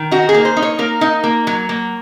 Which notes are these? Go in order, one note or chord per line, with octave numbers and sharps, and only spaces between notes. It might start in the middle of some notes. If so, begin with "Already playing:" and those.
Already playing: D#3
D#4 F#4
G#4
A#3
C5
D#4
C#5
A#3 A#4
D#4
A#3
F#3
A#3